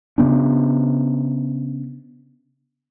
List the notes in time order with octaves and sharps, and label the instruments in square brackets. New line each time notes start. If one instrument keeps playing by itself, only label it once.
[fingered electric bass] C#3 B3 D4